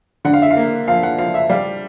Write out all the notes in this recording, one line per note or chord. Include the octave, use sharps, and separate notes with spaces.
D3 F#5
F5
E5
F5
A#3
F3 F5
F#5
F3 F5
E5
G3 F5